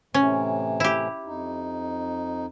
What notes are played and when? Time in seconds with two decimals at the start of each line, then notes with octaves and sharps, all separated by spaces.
0.14 A2 C3 E3 C#4
0.80 E4 G4
1.26 F2 D#4